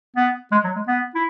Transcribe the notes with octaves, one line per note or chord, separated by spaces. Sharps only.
B3
G#3
F#3
G#3
B3
E4